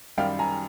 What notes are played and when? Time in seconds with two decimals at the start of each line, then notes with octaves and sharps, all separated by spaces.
0.18 F#2 D#3 G3 F5 G5
0.39 G#5 A#5